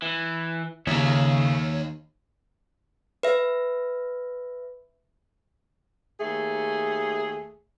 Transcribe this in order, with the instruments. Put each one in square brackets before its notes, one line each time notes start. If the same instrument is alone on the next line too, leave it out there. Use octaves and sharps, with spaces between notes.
[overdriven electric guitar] E3
[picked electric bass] D#2 [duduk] C#3 [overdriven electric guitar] C#5 E5
[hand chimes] B4 E5
[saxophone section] D#2 A3 G#4